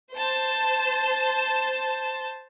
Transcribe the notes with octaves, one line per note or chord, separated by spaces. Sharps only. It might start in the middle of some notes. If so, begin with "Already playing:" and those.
C5 A5